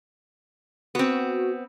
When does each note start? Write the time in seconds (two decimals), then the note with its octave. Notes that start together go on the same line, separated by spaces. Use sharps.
0.95 B3 C4 F#4